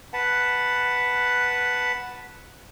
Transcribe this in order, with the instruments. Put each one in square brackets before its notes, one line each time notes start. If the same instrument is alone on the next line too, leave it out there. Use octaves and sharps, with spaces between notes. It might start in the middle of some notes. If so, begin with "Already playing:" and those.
[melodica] B4 F#5 A5